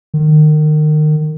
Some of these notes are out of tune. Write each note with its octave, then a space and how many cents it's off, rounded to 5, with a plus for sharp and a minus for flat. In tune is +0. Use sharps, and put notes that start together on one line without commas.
D#3 -30